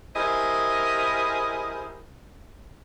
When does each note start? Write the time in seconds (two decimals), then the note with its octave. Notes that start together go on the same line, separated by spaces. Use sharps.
0.16 E4 G4 G#4 A#4 C5 D#5